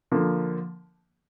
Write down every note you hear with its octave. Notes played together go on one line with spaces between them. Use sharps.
D3 F3 A#3